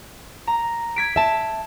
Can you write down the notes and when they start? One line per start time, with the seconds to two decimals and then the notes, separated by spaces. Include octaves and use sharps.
0.47 A#5
0.96 G#6 B6 D7
1.16 E5 A5